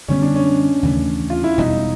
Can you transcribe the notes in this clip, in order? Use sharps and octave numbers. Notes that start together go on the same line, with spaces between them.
F#2 D3 G3 B3 C#4
D4
C#4
D#2 C#3 E3 A3
F4
E4
E1 E2 B2 G3 D#4